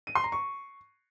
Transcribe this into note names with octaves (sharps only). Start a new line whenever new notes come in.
D#7
C6
A#5
C#6